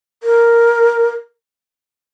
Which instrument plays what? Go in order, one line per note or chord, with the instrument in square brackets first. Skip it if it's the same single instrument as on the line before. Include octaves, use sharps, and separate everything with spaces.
[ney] A#4